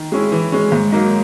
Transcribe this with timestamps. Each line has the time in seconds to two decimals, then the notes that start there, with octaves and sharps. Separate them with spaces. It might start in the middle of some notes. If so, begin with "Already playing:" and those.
Already playing: D#3
0.12 G#3 C#4 E4
0.32 E3
0.52 G#3 C#4
0.72 G#2
0.92 F#3 A#3 D#4